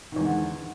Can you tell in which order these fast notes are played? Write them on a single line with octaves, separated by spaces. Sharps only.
D#3 E2 G#3 D3